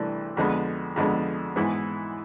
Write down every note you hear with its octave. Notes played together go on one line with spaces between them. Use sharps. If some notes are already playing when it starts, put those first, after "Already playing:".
Already playing: C2 C3 E3 A3 D4
F2 D3 G#3 B3
F2 D3 G#3 B3
G#2 E3 B3 E4